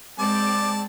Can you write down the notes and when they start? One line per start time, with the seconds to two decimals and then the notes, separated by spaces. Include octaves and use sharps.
0.19 G#3 C4 D5 A5 D6